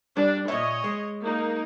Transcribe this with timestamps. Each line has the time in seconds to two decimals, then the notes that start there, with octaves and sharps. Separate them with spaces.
0.17 G3 D4
0.48 A#2 C#5 D#5 E5
0.84 G#3
1.23 A#3 D#4